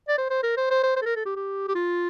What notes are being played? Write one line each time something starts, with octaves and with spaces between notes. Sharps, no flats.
D5
C5
C5
A#4
C5
C5
C5
C5
A4
A#4
A4
G4
G4
G4
F4